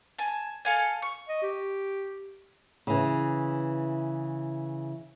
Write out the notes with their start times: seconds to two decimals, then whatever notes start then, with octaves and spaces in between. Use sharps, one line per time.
0.19 G#5 A5
0.65 A4 F5 G#5
1.02 C#6
1.29 D#5
1.42 G4
2.87 C#3 E3